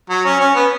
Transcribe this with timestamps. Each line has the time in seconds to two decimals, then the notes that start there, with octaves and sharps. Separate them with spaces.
0.10 F#3
0.25 C#4
0.40 C#4
0.55 B3